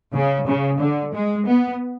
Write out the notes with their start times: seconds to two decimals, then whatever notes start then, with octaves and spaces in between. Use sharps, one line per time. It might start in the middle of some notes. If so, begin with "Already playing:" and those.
0.14 C#3
0.47 C#3
0.80 D3
1.13 G#3
1.47 B3